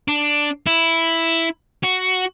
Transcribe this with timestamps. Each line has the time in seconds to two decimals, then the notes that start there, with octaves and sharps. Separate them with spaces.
0.08 D4
0.67 E4
1.84 F#4